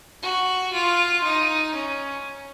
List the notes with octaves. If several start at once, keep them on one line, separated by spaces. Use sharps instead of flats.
F#4
F4
D#4
C#4